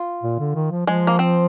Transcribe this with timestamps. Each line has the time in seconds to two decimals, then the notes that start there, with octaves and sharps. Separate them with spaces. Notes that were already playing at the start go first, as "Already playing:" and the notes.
Already playing: F4
0.23 A#2
0.39 D3
0.55 D#3
0.71 F3
0.86 F3 G#3
1.07 A#3
1.19 C4